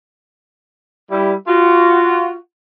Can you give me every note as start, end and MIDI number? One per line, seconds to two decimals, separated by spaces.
1.10 1.33 55
1.10 1.33 64
1.47 2.34 65
1.47 2.34 66